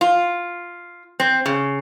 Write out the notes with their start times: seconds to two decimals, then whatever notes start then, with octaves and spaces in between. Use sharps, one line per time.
0.01 F4
1.20 C4
1.46 C#3